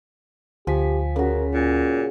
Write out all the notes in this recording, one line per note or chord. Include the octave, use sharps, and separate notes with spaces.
D2 F3 G4 G#5 B6
C#3 F#4 A#4
A#2 C#4